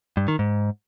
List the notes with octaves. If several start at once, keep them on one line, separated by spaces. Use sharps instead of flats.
G2
D#3
G#2